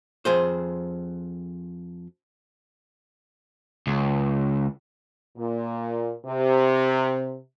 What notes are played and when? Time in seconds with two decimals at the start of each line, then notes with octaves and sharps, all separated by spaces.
0.25 F2 G#4 C5
3.87 C#2
5.37 A#2
6.25 C3